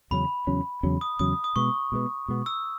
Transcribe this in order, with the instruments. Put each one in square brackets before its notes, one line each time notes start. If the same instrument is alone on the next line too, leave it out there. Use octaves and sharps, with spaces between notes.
[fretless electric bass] E2 C#3 F#3 C#4 [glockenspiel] B5
[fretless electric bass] E2 C#3 F#3 C#4
E2 C#3 F#3 C#4
[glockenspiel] D#6
[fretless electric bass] E2 C#3 F#3 C#4 [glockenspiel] D#6
[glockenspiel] D#6
[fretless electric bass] B2 G#3 B3 [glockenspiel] C#6
[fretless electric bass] B2 G#3 B3
B2 G#3 B3
[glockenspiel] E6